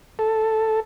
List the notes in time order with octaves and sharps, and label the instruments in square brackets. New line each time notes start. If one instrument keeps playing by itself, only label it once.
[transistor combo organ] A4